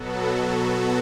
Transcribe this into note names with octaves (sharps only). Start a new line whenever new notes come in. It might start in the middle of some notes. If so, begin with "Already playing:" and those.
Already playing: B2 F#3 B3 F#4 A4